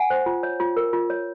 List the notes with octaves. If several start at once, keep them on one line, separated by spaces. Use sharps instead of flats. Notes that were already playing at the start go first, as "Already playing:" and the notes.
Already playing: F#5 G#5
C5
F4
C#5
F4
A#4
F4
C#5